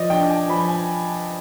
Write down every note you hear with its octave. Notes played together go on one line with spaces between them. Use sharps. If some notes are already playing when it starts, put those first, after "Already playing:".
Already playing: F3 D5 D#5
D4 G5
G#5
F3 B5
G#5